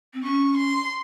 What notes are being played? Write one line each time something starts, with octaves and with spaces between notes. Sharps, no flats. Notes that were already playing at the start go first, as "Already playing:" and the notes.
C4
C#4 C#6
C6